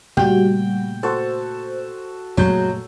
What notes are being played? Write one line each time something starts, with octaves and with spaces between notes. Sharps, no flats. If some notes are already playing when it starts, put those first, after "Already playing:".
A#2 C#3 G3 A3 F#4 G5
F#4 A4 C5
F#1 A#2 F#3 G#3 A3 C#5 G6